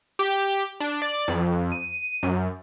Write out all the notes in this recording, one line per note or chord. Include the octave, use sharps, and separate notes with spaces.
G4
D4
D5
F2
D#7
F#2